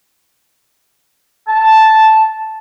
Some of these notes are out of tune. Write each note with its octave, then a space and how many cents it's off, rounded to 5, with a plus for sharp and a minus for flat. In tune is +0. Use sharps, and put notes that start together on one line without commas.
A5 -5